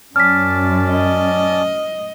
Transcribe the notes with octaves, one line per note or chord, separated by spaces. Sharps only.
F#2 C#4 D5 A5 F6 B6
D#5